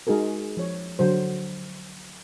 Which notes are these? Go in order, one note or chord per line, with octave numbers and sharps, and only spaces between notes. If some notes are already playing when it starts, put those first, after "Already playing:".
G#3 D#4 F#4 G#4 A#4
F3 C#5
D3 F#3 C5